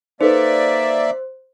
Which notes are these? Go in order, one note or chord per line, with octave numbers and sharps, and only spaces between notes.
A#3 D#4 A4 B4 C5 D5 E5